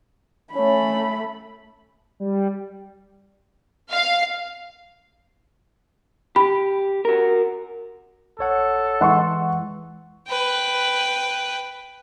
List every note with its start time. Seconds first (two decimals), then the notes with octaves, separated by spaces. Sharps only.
0.53 A3 C#4 B5
2.20 G3
3.90 F5
6.36 G4 B5
7.05 F#4 A#4
8.39 A#1 A4 C#5 F#5
9.01 E3 G#3 F#5 C6 C#6
10.28 B4 G5